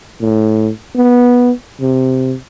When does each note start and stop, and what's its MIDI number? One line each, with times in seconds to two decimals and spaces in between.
0.21 0.70 45
0.96 1.51 59
1.81 2.35 48